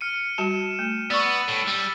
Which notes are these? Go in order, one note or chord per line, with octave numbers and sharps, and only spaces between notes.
F6 C#7 D#7
G3 F#4 A5 E7
A3
B3 D5 C#6 E6 A6 D#7
A2 G7
G3